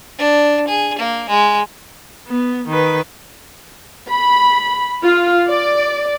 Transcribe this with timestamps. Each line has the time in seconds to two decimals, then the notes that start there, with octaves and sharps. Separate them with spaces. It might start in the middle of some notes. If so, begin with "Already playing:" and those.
0.18 D4
0.68 G#4
0.99 A#3
1.29 G#3
2.28 B3
2.68 D#3 B4
4.09 B5
5.04 F4
5.49 D5